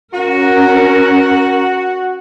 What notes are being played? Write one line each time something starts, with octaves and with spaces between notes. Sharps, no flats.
C#4 F#4 A#4